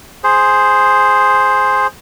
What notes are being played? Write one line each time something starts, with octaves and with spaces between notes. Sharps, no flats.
G#4 C5